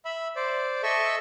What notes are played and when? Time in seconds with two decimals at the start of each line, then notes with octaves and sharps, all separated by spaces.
0.05 E5 B5
0.36 C5 D5
0.83 A4 D#5 E5 C#6 E6